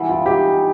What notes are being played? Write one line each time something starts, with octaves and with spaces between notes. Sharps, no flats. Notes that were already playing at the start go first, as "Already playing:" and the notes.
Already playing: E3 G3 B3
F4
D#4 G4